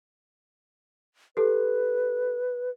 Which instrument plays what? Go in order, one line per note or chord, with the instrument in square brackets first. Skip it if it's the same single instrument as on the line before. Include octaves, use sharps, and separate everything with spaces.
[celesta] G4 A4 [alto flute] B4